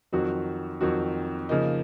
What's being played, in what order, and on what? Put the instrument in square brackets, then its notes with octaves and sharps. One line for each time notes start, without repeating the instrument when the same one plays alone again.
[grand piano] F2 D#3 F#3 C4 F#4
F2 D#3 F#3 C4 F#4
C#3 F3 A#3 D#4